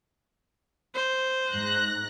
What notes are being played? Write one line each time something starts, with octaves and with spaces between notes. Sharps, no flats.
C5
G#2 F#6 A#6